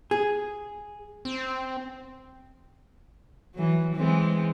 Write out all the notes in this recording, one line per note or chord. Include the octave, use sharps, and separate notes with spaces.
G#4
C4
E3 F#3
E3 G#3 C4